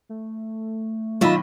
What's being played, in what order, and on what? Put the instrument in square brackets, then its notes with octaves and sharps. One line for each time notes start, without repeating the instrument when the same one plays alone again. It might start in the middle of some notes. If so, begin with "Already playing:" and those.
[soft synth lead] A3
[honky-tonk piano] B1 D#3 B5 [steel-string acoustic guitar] F4 D#5 E5